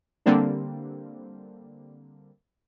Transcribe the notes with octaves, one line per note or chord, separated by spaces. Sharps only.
D3 G3 A#3 C4 D4